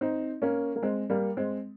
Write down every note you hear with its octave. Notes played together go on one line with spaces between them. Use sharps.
C4 D#4
A#3 C#4
A#3
G#3 C4
G3 A#3
G#3 C4